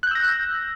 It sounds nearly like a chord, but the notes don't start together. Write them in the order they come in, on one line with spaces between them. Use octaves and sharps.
F#6 G6 E6 A#6